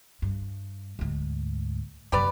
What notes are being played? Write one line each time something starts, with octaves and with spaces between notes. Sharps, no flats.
G2
D2 G#2
F#2 C3 G4 B4 D5